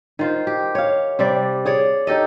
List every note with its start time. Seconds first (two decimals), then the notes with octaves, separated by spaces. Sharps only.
0.19 D#3 F4 C5
0.47 G4
0.75 C#5 F5
1.19 C3 G3 D5
1.65 G#4 C#5 D5
2.07 D#4 G4 A4 D#5